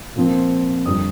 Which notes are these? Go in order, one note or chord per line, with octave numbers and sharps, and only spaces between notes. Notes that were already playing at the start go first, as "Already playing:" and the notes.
A#2 F3 C4
F2 D3 G3 D#6